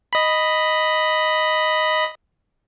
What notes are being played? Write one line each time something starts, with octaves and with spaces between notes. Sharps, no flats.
D#5 B5